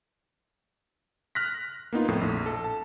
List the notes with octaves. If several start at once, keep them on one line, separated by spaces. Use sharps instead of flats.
F6 F#6 A#6 B6
A#3 B3 D#4 F4
F2 A2
A#1
A4
A5